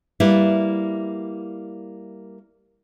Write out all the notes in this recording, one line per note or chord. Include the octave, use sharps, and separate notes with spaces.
G3 A#3 E4 B4